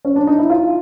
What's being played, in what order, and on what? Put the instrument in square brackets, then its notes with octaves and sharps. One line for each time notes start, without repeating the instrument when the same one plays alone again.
[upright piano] C#4
D4
D#4
E4
F4